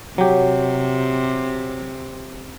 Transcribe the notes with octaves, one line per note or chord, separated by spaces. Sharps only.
C3 F#3 G4